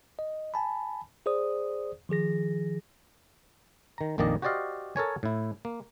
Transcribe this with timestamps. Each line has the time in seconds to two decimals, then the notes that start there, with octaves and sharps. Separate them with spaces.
0.19 D#5
0.54 G#5 A5 B5
1.26 G#4 C5 D5 D#6
2.09 D#3 F3 G#4 A#6
3.98 D#3 A#5
4.18 A#1 F2 D#3 A#3 D5 D#5
4.42 F#4 G4 C5 D5 D#5 F5
4.96 A4 A#4 C#5 G#5
5.23 A2 E4
5.65 A#3